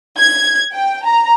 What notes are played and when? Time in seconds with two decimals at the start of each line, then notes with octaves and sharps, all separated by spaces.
0.18 G#6
0.73 G5
1.06 A#5